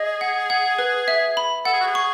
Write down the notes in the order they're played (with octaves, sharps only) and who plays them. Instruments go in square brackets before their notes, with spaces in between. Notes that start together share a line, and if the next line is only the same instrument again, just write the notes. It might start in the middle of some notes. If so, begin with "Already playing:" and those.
Already playing: [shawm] G#4 [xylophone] D#5
[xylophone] F#5
F#5
B4
E5
B5
[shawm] A4 [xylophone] F#5
[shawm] G#4
F#4
G#4
[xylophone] C#6